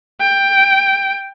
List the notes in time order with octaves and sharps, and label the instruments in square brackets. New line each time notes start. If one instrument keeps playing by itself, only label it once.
[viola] G5